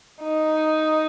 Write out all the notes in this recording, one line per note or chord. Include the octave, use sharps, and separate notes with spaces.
D#4